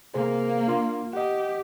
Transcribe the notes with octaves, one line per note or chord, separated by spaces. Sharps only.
C3 A#3 G#4 C5
D4 F4 C6
G4 D#5 F#5